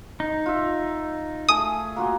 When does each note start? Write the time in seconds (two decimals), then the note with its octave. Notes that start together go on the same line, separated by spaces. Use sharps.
0.20 D#4
0.46 F4 E5
1.48 A3 G#4 D#6
1.96 A#3 F4 F#4